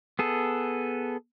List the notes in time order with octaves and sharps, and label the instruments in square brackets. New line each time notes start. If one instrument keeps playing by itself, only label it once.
[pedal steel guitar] B3 G#4 A4